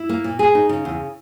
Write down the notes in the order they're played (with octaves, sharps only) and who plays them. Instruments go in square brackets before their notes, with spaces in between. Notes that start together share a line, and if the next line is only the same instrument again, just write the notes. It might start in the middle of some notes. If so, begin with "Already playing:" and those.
Already playing: [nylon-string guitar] E4
A#3
A#2
G#4
D#4
C#3
E2